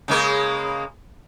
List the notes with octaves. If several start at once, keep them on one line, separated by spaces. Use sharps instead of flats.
C#3 G#3 A#3